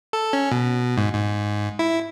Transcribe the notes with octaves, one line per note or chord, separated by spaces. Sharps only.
A4
C#4
B2
G#2
G#2
E4